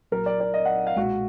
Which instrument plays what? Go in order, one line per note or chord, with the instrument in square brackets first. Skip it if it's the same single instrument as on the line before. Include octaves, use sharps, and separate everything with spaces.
[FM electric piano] A#1 A#2 F#3 [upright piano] A#4
[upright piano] D5
D5
D#5
F#5
F5
[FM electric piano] B1 A#2 G#3 [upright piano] F#4